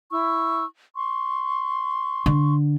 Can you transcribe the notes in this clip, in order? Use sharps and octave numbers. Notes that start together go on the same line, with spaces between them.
E4 C#6 E6
C6 C#6
D3